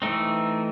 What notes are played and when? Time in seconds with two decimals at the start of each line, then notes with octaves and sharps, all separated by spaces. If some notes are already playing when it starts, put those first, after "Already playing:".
0.02 E3 A3 C4 D#4